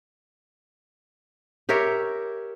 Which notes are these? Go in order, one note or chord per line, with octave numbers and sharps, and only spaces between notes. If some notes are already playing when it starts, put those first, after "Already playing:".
G4 A#4 C#5 E5